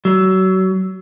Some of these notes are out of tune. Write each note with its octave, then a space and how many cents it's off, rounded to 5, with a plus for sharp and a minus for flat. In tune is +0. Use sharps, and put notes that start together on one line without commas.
F#3 +30